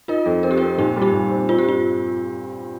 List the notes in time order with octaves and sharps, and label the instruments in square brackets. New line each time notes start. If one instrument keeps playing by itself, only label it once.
[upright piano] D#4 [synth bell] F4 A#4
[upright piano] F2
[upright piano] C4 [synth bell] A#4
[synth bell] G4
[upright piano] C4 [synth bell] F4 A#4
[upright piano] A#2 [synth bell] D#4 G4
[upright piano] G3
[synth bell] D#4 G4
[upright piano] A#2
C4
[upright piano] C4 [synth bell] F4
[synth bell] G4
[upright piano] G2 [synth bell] F4